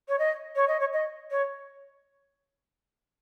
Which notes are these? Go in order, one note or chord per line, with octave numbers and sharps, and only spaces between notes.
C#5
D#5
C#5
D#5
C#5
D#5
C#5